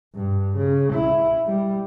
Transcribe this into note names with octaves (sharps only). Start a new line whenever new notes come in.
G2
C#3
E4
G3